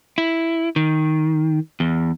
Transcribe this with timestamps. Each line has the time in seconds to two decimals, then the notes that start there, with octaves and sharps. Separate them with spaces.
0.18 E4
0.76 D#3
1.80 E2